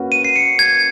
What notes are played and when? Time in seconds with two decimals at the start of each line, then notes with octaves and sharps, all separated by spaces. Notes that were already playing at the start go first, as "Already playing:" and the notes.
Already playing: A#3 C#4 F#4 B4
0.12 D#7
0.25 C7
0.36 C#7
0.59 G#6